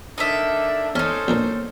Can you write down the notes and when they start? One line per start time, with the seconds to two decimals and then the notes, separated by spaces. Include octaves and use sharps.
0.18 D3 D4 D#4 A#4 E5
0.95 E2 C#4 D#4 A4 C5
1.28 A#1 A#2 A#3